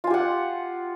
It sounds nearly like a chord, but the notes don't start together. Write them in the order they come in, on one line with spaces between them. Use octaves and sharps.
F4 G#5 G4 F#5